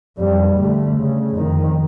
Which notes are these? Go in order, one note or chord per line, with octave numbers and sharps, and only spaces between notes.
F2 G3
D3 A3
C#3
F2 D#3